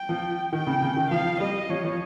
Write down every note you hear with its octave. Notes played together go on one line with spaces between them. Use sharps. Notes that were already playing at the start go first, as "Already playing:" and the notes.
Already playing: G5
F3
D#3 G5
C#3
C#3
D#3
F3 F5
G3 D#5
F3 C#5
F3